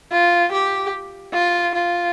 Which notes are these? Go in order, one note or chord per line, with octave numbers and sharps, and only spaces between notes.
F4
G4
F4
F4